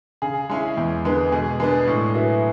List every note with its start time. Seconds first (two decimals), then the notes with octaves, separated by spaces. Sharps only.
0.22 C#3 G#4
0.50 G#3 C#4 E4
0.77 E2
1.04 D3 G#3 B3
1.32 B2 G#4
1.60 G#3 B3 D4
1.87 A2
2.15 F#3 B3 E4